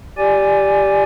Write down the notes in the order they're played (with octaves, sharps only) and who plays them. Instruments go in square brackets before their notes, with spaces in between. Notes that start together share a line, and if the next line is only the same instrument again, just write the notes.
[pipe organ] G4 D5 G#5